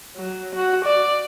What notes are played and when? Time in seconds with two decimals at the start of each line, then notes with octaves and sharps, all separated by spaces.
0.16 F#3
0.55 F#4
0.85 D5